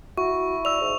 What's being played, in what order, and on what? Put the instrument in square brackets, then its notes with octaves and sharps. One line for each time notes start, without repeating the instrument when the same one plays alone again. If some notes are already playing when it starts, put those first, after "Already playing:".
[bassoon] E4 [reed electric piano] F#4 [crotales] C#6
[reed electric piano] D5 E6 [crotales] F7
[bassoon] G#2